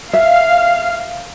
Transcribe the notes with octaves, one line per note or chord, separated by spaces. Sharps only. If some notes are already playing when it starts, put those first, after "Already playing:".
E5 F5